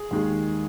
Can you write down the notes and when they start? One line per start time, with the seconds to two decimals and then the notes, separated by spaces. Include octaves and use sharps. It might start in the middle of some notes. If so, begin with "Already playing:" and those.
Already playing: G#4
0.11 D#2 D#3 G#3